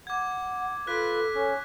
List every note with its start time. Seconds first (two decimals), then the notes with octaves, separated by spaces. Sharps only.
0.07 F#5 D6 G#6
0.87 F4 A4 B4 F#6 B6
1.35 C#4